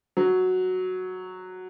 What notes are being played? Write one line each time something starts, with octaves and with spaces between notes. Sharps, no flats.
F#3